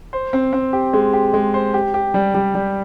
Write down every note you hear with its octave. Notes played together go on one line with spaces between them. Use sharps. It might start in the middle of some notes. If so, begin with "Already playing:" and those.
C5
C4
C4
G4
G#3
G4
G#3
C5
G4
G4
G3
G3
G3